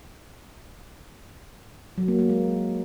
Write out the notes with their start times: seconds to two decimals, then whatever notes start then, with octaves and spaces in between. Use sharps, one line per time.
1.98 F#3
2.08 A#3
2.19 A#3
2.29 G#3